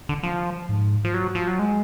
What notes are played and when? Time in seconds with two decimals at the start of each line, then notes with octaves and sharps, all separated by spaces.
0.09 D3
0.23 F3
0.69 G#2
1.05 F3
1.14 F#3
1.35 F3
1.48 F#3
1.59 G#3